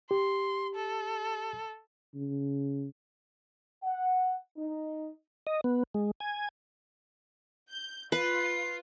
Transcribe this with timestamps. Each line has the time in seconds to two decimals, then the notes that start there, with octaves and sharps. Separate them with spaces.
0.11 G4 C6
0.75 A4
2.15 C#3
3.83 F#5
4.57 D#4
5.47 D#5
5.64 B3
5.94 G#3
6.20 G#5
7.71 G6
8.12 F4 B4 C7